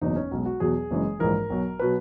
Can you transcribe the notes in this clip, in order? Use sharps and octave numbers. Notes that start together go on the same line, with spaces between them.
F#1 E2 B2 D#4
C#4
B1 B2 G#3
F#4
E2 B2 F#3 G#4
F#1 F#2 E3 G#3
A#1 G#2 E3 G#3 A#4
B1 B2 F#3
B2 F#3 B4